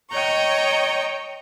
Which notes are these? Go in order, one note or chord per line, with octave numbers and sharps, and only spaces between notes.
C#5 D#5 G5 A#5 C#6